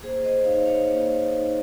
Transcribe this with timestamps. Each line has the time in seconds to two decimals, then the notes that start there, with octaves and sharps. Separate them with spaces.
0.03 A#3 G#4 C5
0.24 C5 D#5
0.45 D#4 C#5 F5
0.66 C#5 F5
0.87 A#3
1.29 D#4